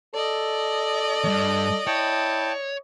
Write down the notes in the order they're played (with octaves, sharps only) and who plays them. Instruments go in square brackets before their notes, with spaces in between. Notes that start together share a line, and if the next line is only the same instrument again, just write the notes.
[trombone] A4 [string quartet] D5 D#5
[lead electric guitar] E2 G2
[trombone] E4 [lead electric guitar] C#5 [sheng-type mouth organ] G5 A5